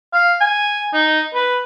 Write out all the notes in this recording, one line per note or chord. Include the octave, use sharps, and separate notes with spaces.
F5
G#5
D#4
B4